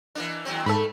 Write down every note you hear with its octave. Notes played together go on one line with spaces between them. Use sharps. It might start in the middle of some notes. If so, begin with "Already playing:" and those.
E3 A#3 D4
D#2 F#3 C4
G#2 A3 A#3 A4 B5